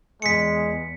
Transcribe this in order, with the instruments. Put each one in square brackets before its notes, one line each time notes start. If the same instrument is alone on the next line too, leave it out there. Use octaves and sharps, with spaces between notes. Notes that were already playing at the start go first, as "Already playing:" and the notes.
[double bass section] E2 [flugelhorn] G#3 [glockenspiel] B6 C#7